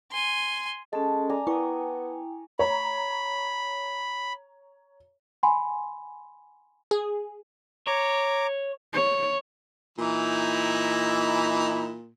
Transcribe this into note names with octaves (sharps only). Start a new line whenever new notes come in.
G#5 C6
G#3 C#4 A4 A5
D5 G#5 A#5
B3 E4 G5 G#5 C#6 D#6
C#5 A#5 B5
F#5 G#5 B5 C6
G#4
C#5 A#5 D6
C#5
A#2 E3 D#4 E4